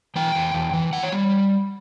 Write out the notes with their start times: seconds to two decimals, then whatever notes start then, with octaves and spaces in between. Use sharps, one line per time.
0.16 E3 G5
0.35 E2
0.54 E2
0.73 E3
0.93 E3 F#5
1.03 C#5
1.12 G3